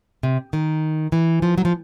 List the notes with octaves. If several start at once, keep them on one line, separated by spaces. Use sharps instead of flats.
C3
D#3
E3
F3
F#3
F3